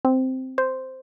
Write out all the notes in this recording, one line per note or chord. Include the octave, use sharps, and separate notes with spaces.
C4
C5